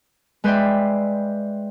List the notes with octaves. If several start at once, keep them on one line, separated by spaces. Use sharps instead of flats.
G#3 B4 C5 D5 E5 G5